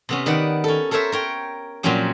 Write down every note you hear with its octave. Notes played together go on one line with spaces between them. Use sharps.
C3 B3 C#4
D#3 B4 D5 F#5
C#4 A4
A4 A#4 C5 C#5 E5
A#4 C#5 G5
A#2 F3 F#3 C4 C#4 G4